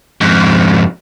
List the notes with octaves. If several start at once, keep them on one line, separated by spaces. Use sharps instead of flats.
F2 G#2